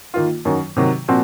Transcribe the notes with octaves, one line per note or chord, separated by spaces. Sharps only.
D#3 A#3 F4
F#2 D#3 F#3
C3 D#3 F#3
A#2 F3 C4 F#4